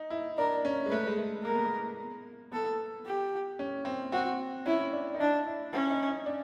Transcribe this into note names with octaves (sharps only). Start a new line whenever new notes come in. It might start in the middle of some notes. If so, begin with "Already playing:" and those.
Already playing: D#4
E4
D4 A#4
C#4
G#3
A3 B4
G#3
A3
A#3 A#4
B3
A#3
B3 A4
G4
C#4
C4
C4 F#4
C#4 E4
D4
D#4
D4 E4
E4
C#4 E4
D#4
D#4
D4